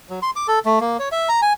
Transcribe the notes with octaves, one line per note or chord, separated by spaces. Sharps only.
F#3
C6
D6
A4
A3
A#3
C#5
E5
A#5
G#5